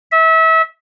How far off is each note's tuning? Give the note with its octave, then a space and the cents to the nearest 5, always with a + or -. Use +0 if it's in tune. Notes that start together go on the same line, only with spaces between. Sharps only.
E5 -30